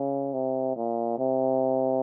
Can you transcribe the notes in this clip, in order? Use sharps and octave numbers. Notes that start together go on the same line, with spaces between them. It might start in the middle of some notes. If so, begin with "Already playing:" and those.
Already playing: C#3
C3
A#2
C3